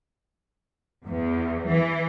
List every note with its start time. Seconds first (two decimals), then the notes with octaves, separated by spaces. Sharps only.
1.05 E2
1.68 E3